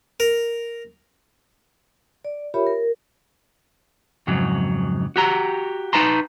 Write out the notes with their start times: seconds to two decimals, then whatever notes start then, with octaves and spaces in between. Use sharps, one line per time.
0.20 A#4
2.25 D5
2.54 F4 G4 A#4 C#5 E5 B5
2.67 A#4
4.27 F2 G#2 C#3 F#3
5.16 F#4 G4 A#5
5.93 D#4 B4 A5 A#5 C6